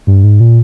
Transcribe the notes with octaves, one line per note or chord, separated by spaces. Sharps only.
G2
G#2
A#2